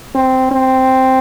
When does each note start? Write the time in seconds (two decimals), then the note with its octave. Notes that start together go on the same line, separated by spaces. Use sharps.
0.15 C4
0.51 C4